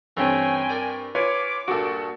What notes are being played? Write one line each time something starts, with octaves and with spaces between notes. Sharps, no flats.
G2 E3 A3 C4 C#4 G5 G#5
A#4 D5
F4 B4 C#5 G#5 D6
G2 A#2 F#4 A4